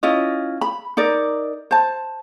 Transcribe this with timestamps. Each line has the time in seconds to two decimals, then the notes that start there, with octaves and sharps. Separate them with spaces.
0.03 C#4 E4 F4 D#5
0.61 B5
0.97 D#4 A#4 D5
1.71 C5 A5